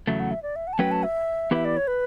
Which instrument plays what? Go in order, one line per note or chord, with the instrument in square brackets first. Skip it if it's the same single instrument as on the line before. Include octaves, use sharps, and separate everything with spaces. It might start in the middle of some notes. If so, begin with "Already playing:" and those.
[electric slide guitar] E2 C#3 F#3 A3 [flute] E5
[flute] F#5
E5
D5
E5
F#5
A5
[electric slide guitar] F#3 A3 C#4 F#4 B4 [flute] G5
[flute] A5
E5
[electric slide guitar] E3 B3 E4 G4 B4 [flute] E5
[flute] D5
C#5
B4